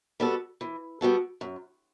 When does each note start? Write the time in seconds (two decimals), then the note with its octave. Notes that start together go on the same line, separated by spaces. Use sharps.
0.20 G3 B3 F#4 A4
0.61 E3
1.01 G3 B3 F#4 A4
1.41 F#2